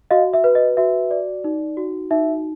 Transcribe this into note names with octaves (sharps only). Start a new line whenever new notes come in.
F#4 D#5 F5
E5
B4
D#5
F#4 E5
D5
D#4
F#4
D#4 E5